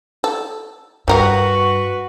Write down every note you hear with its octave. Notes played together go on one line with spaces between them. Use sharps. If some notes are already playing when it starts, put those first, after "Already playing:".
A4
G2 G3 F#4 A#4 B4 F5